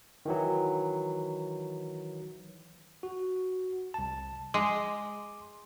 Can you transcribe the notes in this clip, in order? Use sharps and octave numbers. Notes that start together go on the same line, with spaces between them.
D#3 E3 F#3
F#4
C2 A5
G#3 C6 D6